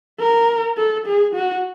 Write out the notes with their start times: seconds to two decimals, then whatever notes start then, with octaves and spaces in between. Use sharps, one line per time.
0.20 A#4
0.77 A4
1.07 G#4
1.35 F#4